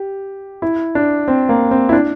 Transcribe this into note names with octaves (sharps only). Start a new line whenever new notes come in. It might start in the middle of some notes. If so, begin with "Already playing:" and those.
Already playing: G4
E4
D4
C4
A#3
C4
E4
D4